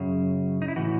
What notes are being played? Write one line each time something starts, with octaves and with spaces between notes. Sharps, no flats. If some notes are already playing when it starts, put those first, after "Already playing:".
Already playing: F#2 C#3
D#4
E4
A2 E3 F#4